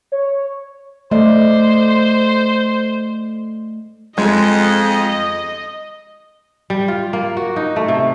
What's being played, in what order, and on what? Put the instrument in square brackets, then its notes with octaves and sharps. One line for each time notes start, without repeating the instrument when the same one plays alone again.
[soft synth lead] C#5
[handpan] A3 D5 D#5 [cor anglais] C5
[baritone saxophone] F2 [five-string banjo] G#3 [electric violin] D#5
[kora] G3
F4
A#3
F#4
D#4
A3
C3